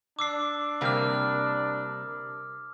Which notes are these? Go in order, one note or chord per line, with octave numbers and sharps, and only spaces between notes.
D4 D6 E6 C7
C3 G3 A#3 D6 F6